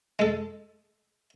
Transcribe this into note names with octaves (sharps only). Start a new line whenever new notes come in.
G#3 A4